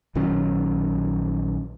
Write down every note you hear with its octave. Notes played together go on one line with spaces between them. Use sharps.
A#1 D#3 F#3 C#4